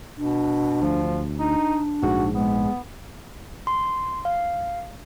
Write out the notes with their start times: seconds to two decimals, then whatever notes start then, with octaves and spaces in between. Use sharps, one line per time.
0.18 B2 D4
0.82 D2 F3
1.39 D4 D#4
2.03 A#1 G#2 F#4
2.35 G#3 B3
3.67 C6
4.25 F5